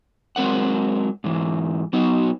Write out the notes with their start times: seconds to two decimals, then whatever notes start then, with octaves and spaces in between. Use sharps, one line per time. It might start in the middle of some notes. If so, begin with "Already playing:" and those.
0.36 F#3 G#3 C4 A#4 F#5
1.24 G#2 E3
1.93 F#3 B3 D#4 F#4